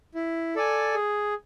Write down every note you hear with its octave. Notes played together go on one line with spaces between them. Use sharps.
E4
A4 D5 G#5
G#4